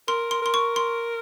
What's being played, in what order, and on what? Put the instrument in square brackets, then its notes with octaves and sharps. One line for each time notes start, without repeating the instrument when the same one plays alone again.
[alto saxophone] A#4 [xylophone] C6
[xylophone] C6
[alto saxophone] A#4 [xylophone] C6
[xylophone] C#6
C6